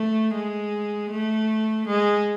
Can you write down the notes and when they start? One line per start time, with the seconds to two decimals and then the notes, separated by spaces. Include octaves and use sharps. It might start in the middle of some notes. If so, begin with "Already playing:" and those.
Already playing: A3
0.35 G#3
1.10 A3
1.87 G#3